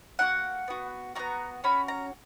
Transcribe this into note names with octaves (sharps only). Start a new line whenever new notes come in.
A#3 D#4 F#4 F#5
B3 F#4
B3 D#4 F#4 A#5
C#4 F#4 B5
A#5